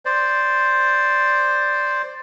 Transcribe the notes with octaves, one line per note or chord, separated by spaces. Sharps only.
C5 D5